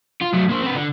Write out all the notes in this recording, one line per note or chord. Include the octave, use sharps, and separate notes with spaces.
F4
F#3 A3
A#3 C5
C4 B4
D3